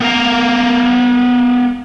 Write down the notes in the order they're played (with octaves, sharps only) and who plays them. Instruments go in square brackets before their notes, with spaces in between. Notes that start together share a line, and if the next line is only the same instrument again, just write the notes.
[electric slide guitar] B3 A#4 F5 A#5